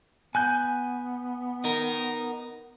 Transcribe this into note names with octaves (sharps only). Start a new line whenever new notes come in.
B3 G#5 F#6 G6
D#4 A#4